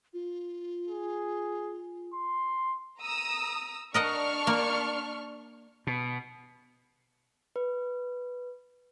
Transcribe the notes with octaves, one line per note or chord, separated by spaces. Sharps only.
F4
G#4
C6
A#5 D#6 E6
D4 A#4 D#5 F#5 C#6 F6
A#3
B2
B4